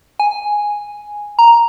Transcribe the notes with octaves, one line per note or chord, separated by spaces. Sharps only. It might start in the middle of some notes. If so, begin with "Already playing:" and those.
G#5
A#5